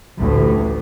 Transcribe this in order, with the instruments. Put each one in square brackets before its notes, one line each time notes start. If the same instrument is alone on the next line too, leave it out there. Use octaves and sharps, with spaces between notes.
[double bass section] A1 D2 A2